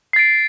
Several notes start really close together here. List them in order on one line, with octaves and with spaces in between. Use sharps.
C7 A6 D7